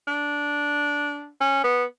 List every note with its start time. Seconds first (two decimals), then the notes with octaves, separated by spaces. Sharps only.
0.07 D4
1.41 C#4
1.64 B3